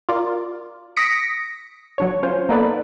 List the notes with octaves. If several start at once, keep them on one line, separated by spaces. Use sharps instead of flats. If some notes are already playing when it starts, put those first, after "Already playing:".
F4 A#4 D5
D#6 A#6 B6 C#7 D7
F#3 D4 C#5
C#4 F4 C5
A#3 B3 D#4 A4 B4 D5